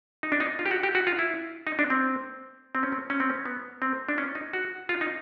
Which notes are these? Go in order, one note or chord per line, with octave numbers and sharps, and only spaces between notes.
D#4
D4
D#4
F4
G4
F#4
G4
F#4
F4
E4
D#4
D4
C4
C4
C#4
C4
C#4
C4
C#4
B3
C4
D4
C#4
D#4
F#4
F4
D#4